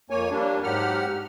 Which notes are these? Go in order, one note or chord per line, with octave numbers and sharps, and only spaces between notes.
F2 A#3 C#5 G#5
G3 A#3 D4
G#2 F#3 G4 F#5 F6